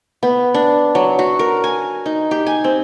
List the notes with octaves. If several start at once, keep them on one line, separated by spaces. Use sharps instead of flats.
B3
D4
F#3
F#4
A#4
G#5
D#4
G4
G#5
C4